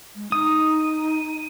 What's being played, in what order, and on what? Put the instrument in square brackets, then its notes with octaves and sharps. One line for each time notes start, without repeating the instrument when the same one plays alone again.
[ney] G#3
[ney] D#4 [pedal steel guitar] D#6